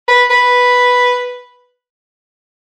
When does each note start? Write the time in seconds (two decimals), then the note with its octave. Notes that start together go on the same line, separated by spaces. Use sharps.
0.08 B4
0.30 B4